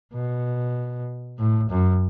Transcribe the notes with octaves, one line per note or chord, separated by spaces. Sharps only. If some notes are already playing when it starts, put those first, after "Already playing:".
B2
A2
F#2